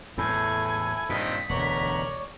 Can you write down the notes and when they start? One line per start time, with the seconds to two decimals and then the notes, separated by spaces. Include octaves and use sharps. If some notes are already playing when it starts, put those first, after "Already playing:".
0.18 E2 A2 E4 A4 G#5
1.09 G2 A#2 D#3 C4 D#5 B6
1.49 E1 D2 A#4 C#5 D5 F#5